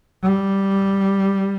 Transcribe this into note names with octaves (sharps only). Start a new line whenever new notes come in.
G3